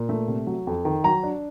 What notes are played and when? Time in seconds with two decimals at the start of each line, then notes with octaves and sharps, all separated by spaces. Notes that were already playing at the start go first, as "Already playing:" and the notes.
Already playing: A#2
0.09 A3
0.28 C3
0.47 F#3
0.67 F2
0.85 D#3
1.04 F#3 A#5
1.23 D4